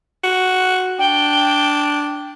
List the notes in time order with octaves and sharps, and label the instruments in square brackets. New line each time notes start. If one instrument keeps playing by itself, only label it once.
[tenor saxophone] F#4
[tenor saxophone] D4 [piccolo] G5